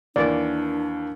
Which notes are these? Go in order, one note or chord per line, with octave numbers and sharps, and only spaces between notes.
D#2 E3 A#3 D4 D5